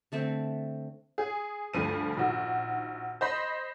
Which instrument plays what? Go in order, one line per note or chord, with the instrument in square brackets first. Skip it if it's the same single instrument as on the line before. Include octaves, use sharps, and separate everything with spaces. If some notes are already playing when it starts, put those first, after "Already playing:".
[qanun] D3 A3 C4
[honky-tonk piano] G#4
D2 G2 F3 D#7
A#1 D#3 F#4
C5 D#5 B5 C6